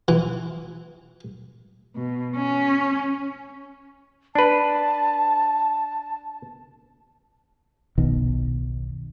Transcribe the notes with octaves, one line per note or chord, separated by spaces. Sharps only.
E3
B2
C#4
D4 B4 A5
F#1 B1 B2 D#3